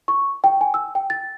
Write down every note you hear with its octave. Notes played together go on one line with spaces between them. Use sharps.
C#6
G5
G#5
E6
G5
A6